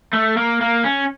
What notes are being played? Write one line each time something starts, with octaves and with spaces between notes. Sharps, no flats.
A3
A#3
A#3
C#4